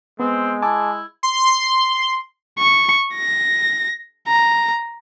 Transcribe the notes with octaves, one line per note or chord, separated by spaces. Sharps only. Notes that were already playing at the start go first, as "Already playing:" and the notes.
G#3 B3 C4
E4 G#5 A5 D6
C6
C#6
A#6
A#5